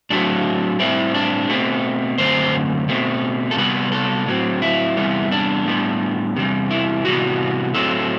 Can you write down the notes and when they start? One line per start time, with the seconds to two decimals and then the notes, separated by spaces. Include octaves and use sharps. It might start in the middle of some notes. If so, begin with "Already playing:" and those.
0.10 A2 F#3 A3 C4 D4
0.79 A2 G3 C4 E4
1.15 D4
1.49 B2 A3 C4
2.18 F#2 D3 A3 C4 C5
2.88 B2 A3 C4
3.51 A4
3.57 C3 G3 B3 B4
3.92 A4
4.26 A2 F#3 C4
4.62 E4
4.96 E2 C3 G3 B3
5.31 D4
5.65 A2 G3 B3
6.36 E2 C3 G3
6.70 E4
7.05 C3 E3 G3 B3 F#4
7.74 A2 F#3 C4 A4